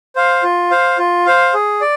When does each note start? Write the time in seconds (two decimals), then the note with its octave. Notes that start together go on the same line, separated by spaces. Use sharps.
0.16 C5 F5
0.43 F4
0.71 C5 F5
0.98 F4
1.26 C5 F5
1.54 G#4
1.81 D5